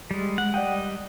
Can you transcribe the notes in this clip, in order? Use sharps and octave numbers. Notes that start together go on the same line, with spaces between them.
G3 G#3
G#3 F#5
G3 D5 D#5 F#5 G5